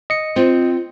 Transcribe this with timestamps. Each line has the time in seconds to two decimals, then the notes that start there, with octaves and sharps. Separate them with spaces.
0.10 D#5 C#7
0.36 C4 F4